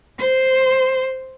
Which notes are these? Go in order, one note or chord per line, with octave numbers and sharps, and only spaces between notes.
C5